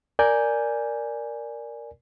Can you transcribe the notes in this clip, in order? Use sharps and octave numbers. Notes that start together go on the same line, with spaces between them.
A#4 D5 G#5 G6